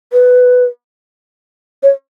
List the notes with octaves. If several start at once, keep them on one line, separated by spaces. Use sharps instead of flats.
B4
C#5